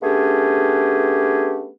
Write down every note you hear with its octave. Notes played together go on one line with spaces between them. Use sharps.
A3 B3 C#4 D4 G4 G#4